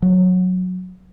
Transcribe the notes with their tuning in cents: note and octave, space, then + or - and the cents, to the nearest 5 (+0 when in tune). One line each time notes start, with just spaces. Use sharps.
F#3 -15